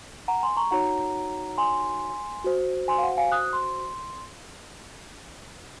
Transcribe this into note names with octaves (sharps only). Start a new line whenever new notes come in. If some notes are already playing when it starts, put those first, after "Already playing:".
F#5 A#5
G#5 C6
A#5 C#6
D#4 F#4 C#5 F#5 A#5
G#5 C6
F#4 C5
G#5 C6
F5
F#5
F5 G#5
D#6 F#6
C6